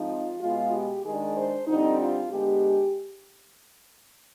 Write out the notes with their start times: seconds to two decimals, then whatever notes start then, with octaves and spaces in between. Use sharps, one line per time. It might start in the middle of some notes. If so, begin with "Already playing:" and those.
Already playing: G#2 F3 C4 D#4
0.10 F4
0.41 B2 G#3 B3 F4
0.73 G4
1.04 D#3 G#3 D4 G#4
1.36 C5
1.67 F2 D3 G3 C4 D#4
1.98 F4
2.30 D3 G#3 B3 G4